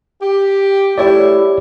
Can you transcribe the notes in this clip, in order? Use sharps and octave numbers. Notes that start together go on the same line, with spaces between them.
G4
A3 E4 G4 C#5 D5